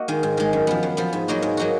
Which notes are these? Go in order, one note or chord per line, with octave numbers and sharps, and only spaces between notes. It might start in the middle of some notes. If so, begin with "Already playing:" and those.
Already playing: A#3 D#4 F#4
D#3 G#3
G#2
D#3 G#3
F#2
F3 B3
F#2
F3 B3
G#2
F#3 A#3 D#4 F#4
G#2
F#3 A#3 D#4 F#4